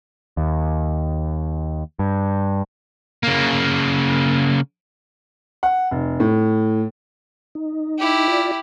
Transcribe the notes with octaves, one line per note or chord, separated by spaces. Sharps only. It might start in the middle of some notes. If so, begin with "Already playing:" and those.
D#2
G2
C#3 A#3
F#5
F1
A2
D#4
E4 G4
F4 D5